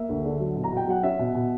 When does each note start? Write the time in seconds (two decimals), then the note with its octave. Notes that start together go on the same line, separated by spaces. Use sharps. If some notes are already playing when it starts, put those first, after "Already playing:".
Already playing: A#3 E5
0.09 D2
0.25 D3
0.40 F#3
0.56 B2
0.64 A#5
0.72 B2 G5
0.88 F#3 F#5
1.03 C#4 E5
1.19 B2
1.35 B2